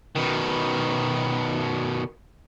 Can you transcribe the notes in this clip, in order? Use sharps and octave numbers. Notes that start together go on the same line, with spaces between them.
B2 D#3